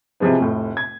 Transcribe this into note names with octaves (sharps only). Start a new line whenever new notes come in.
C3 E3 F3 G#3 B3
F1 A2
G#6